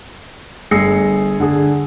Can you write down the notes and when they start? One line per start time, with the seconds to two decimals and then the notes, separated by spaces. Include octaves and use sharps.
0.71 G1 G#4 E6 A#6 C7 C#7
1.40 D3 G#4